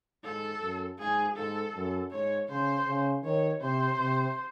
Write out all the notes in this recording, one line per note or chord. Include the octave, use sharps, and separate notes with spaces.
G#2 A4
F#2
G#2 G#4
G#2 A4
F#2
G#2 C#5
C#3 C5
C#3
D#3 C#5
C3 C5
C3